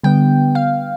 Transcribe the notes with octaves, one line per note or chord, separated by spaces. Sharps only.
D3 G3 B3 G5
F5